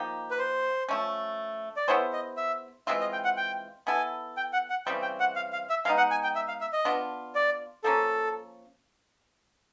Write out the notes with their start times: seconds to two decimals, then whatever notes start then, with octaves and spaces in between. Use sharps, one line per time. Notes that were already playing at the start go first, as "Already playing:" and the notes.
Already playing: F3 A#3 D#4 G4
0.31 B4
0.39 C5
0.89 F3 A3 C#4
1.77 D5
1.88 B3 E4 G#4 C5 C#5
2.13 D#5
2.37 E5
2.87 E3 G#3 C4 F4 E5
3.00 D#5
3.13 G5
3.24 F#5
3.37 G5
3.87 B3 E4 A4 G#5
4.37 G5
4.53 F#5
4.70 F#5
4.86 C#3 E3 G3 C4 G5
5.02 G5
5.20 F#5
5.36 F5
5.53 F5
5.70 E5
5.85 G#3 B3 D#4 F5
5.97 F#5
6.11 G#5
6.23 G5
6.35 E5
6.48 F5
6.61 E5
6.73 D#5
6.85 B3 D4 F4
7.35 D5
7.84 F3 A#3 C#4 A4